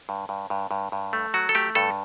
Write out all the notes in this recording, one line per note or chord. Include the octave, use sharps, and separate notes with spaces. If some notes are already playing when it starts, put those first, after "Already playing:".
G2
G2
G2
G2
G2
A3
F#3 F#4
A4
A3 G4
G2 A4